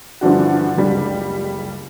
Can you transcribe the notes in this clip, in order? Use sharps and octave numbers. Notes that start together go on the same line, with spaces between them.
G2 D3 E3 F3 D4 F#4
F#1 C#2 G3